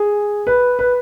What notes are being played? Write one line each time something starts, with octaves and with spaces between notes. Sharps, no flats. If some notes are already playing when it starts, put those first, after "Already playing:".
Already playing: G#4
B4
B4